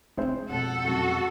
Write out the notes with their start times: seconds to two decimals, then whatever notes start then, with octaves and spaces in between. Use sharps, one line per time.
0.17 G#3 A3 C4 D4 C5
0.50 F2 B2 A4 F#5
0.84 F#2 C3 G#3 F#4